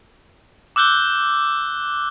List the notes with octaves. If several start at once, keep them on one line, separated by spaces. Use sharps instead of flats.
D6 E6 F#6 G6 G7